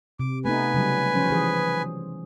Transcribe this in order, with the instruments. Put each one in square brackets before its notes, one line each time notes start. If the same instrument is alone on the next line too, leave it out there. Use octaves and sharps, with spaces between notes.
[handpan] C3 [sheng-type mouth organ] D6
[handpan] A3 B3 D#4 [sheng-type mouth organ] B4 G#5
[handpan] C#3 F#3 G3
F3 C#4 C5
E3 G#4